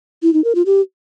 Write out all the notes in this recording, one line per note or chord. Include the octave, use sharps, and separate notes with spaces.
E4
D#4
A#4
F4
G4